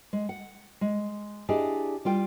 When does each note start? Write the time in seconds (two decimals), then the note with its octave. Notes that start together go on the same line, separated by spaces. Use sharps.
0.13 G#3
0.29 F#5
0.81 G#3
1.49 D4 E4 G4 G#4 D5 D#5
2.05 G3 F4 G5